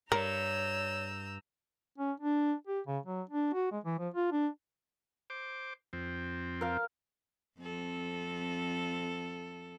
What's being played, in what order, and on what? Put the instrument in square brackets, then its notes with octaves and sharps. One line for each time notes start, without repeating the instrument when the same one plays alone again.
[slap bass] G2 [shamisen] A#4 [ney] C#5 [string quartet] A#5 E6 G6
[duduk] C#4
D4
G4
C#3
F#3
D4
F#4
G#3
E3
F3
F4
D4
[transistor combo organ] C5 D6
F2 C4
[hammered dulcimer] A#4 F5
[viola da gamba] F2 C4 A4